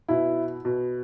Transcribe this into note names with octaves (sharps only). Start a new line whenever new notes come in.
B2 E4
B2